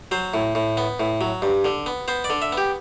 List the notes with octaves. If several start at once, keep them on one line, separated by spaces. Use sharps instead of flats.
F#3 C5
A2
A2
B3
A2
F#3
G2
D3
B3
B3 C5
D5
D3
E5
B3
G4